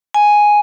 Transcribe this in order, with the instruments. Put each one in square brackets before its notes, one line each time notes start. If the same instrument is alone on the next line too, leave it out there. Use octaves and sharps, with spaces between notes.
[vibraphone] G#5